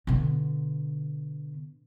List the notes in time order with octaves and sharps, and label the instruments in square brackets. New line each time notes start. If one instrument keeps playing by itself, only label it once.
[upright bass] B2 D3